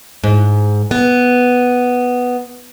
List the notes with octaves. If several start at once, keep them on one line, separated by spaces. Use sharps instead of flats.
G#2
B3